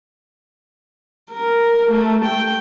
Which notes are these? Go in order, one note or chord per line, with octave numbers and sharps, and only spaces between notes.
A#4
A3
G5